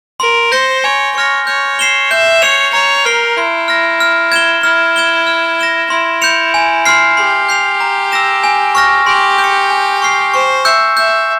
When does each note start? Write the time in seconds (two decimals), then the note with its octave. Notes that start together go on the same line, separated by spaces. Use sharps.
0.20 A#4 C6
0.51 C5 G6 A#6 C#7 G7
0.84 C#5 G#5
1.15 C#5 C#6 F6 A#6
1.46 C#5 G6
1.79 C7 E7 G7
2.11 E5 G6
2.42 C#5 C#7 F7
2.73 C#5 A#5
3.05 A#4 F6 C7 G7
3.37 E4 C6
3.68 F6 A#6
4.00 F6
4.32 G#6 E7 G7
4.63 E4 F6
4.96 G#6 E7 G7
5.27 F6
5.59 A#6 E7 G7
5.90 E4 C6
6.22 G6 C#7 F7
6.54 G#5
6.85 C6 F6 C7
7.16 G4 C6
7.49 G6 C7 F7
7.80 A#5
8.12 E6 A#6 E7
8.44 G#5
8.75 C#6 F6 A#6
9.06 G4 C6
9.38 G6
9.44 C#7
9.70 G#5
10.02 C#6 F6 C7
10.34 C5 C#6
10.65 E5 E6 G6 C#7
10.97 E5 G6